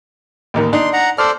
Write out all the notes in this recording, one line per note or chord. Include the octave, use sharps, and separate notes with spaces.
A1 D#2 D#3
D4 D#4 C6
F#5 A#5
A4 C5 D5 F6